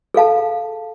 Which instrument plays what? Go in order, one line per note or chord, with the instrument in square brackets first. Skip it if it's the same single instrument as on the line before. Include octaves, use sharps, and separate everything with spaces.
[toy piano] G#4 A4 F5 A5